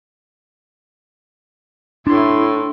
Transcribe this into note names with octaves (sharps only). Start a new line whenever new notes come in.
A2 D4 E4 C6